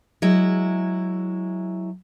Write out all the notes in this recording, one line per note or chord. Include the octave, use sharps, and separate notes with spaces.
F#3 G#3 E4